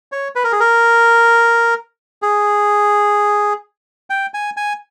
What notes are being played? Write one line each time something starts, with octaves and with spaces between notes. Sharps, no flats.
C#5
B4
A#4
G#4
A#4
G#4
G5
G#5
G#5